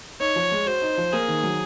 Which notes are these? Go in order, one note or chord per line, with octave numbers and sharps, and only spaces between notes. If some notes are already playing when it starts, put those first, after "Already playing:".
D#4 C#5
F3
G#3
F#4 C5
D#4
F3
A#3 G#4
D#3
F#3